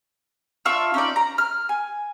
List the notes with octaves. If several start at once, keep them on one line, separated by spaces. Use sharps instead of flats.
D4 F4 E5 C#6
C#4 D#4 D5
A#5
F6
G#5